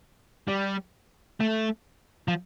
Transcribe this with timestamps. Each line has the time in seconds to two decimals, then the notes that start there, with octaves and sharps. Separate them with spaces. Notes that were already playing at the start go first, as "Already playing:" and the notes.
0.48 G3
1.40 A3
2.28 F3